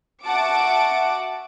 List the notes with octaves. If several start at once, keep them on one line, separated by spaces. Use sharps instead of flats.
F#4 E5 F#5 A5 D6 D7